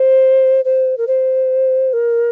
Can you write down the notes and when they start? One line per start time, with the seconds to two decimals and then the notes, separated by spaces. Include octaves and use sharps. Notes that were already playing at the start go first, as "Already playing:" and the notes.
Already playing: C5
0.65 C5
0.98 A#4
1.07 C5
1.93 A#4